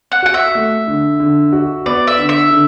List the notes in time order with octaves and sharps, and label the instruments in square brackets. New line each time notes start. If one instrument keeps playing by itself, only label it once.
[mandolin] F#5
[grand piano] F#4 [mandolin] F#5
[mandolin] E5
[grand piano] A3
D3
D3
F#4
[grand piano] B3 [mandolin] D5
[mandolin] E5
[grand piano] D3
[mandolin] E5
[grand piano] D3